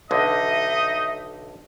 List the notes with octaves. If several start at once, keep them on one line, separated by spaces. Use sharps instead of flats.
B1 D3 D#4 D#5 E5